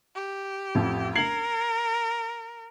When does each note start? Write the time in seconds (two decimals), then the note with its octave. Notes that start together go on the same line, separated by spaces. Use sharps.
0.15 G4
0.75 A1 F2
1.15 A#4 G#6 C7 F#7